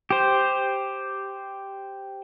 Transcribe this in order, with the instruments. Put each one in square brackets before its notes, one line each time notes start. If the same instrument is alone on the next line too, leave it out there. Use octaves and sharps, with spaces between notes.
[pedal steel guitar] G4 C5